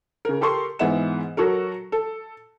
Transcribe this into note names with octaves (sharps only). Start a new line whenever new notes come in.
C#3 A#4
G4 A4 A#4 C6 C#6
G#2 E3 B3 E5 F#5 E7
F#3 F#4 A4 A#4
A4